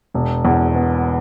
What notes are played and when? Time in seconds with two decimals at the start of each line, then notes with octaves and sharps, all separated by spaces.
0.14 E1
0.45 E2
0.75 B3